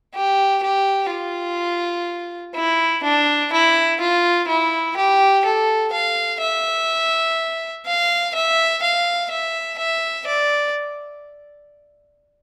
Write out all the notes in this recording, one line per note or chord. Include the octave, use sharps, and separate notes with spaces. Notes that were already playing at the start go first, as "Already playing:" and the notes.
G4
G4
F4
E4
D4
E4
F4
E4
G4
A4
F5
E5
F5
E5
F5
E5
E5
D5